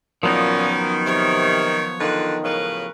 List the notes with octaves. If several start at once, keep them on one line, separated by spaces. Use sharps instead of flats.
A#2 D#3 F3 F#3 B3 C#4 D#4
C3 C#5
D3 D#3 F4 B4
A2 C#3 A#4 B4